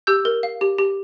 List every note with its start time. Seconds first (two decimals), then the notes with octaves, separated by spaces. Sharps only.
0.07 G4 E6 G6
0.25 A#4
0.43 F5
0.61 G4
0.78 G4